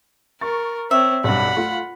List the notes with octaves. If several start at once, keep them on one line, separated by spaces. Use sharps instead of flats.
A#4 C#6 A6
C4 C#5 E5
B1 G2 F#5 B5
A3 F4